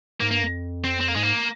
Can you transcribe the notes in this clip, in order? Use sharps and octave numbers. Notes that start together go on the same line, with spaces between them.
G#2 A#3
G2 A#3
F2
C4
C4
A#3
G#2 G#3
A#3